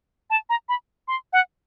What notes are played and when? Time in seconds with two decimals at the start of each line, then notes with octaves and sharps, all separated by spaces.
0.30 A5
0.50 A#5
0.69 B5
1.08 C6
1.33 F#5